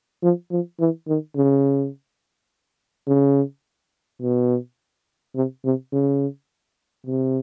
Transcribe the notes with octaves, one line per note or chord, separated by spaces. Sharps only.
F3
F3
E3
D#3
C#3
C#3
B2
C3
C3
C#3
C3